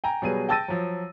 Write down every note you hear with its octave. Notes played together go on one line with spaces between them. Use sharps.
G5 G#5 A#5
B2 F#3 G3 G#4 B4 D#7
G5 A5 E6 A6 A#6 D#7
F3 F#3